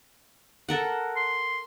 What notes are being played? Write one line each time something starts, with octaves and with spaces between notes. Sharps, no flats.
A4 A#4 F#5
C6